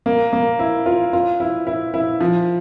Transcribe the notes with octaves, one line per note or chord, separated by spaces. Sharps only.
A#3
A#3
E4
F4
F4
E4
E4
E4
F3